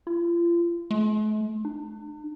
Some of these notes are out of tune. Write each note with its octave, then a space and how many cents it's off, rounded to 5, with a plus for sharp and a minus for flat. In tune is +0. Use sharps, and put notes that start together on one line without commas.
F4 -35
A3 -45
D4 +45